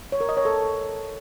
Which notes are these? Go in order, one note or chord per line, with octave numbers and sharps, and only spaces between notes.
C#5
A#4
D#5
C#5
A4